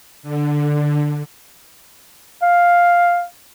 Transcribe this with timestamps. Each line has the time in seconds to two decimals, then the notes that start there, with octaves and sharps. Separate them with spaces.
0.23 D3
2.42 F5